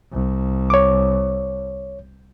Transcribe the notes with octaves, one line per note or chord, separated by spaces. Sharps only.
C2
C#5 D6